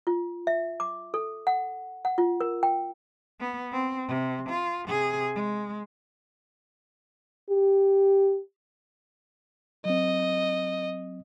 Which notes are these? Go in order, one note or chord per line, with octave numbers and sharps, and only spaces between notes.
F4
E5
D6
A4
F#5
F#5
F4
A#4
G5
B3
C4
C3
F4
C3 G#4
G#3
G4
F#3 C4 D#5